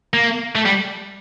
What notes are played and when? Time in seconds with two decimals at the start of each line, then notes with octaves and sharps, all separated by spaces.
0.14 A#3
0.55 A3
0.65 G3